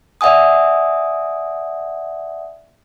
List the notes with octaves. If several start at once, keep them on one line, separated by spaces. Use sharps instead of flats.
D5 E5 F#5 G#5 D#6